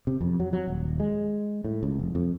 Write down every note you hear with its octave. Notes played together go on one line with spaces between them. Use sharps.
C3
F2
F#3
F#3
D#1
G#3
A2
C#2
F1
F2